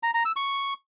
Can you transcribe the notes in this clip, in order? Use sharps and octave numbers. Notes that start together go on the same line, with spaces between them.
A#5
A#5
E6
C#6